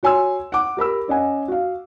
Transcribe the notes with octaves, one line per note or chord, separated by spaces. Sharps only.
F#4 C#5 G#5 C6 E6
F#5 D6
G4 A#4 B5 E6
C#4 D#5 F#5 G#5
F#4 F5